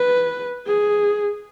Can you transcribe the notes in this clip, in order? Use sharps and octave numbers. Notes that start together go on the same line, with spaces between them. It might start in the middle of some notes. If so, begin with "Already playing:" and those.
Already playing: B4
G#4